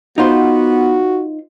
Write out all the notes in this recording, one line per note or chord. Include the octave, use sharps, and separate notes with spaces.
B3 D#4 F4 F#4 C5